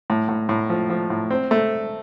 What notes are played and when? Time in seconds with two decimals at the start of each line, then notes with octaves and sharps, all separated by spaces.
0.10 A2
0.29 A2
0.49 A2
0.70 F3
0.90 F3
1.10 A2
1.30 C4
1.51 A3